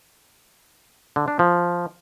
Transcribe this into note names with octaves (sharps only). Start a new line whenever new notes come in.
D3
D4
F3